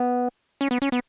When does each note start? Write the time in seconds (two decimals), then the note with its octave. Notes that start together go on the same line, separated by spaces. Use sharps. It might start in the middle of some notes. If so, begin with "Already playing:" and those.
Already playing: B3
0.61 C#4
0.71 B3
0.82 C#4
0.92 B3